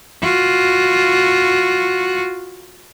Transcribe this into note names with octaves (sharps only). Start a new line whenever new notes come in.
F4 F#4